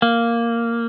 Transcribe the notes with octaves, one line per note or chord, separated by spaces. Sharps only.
A#3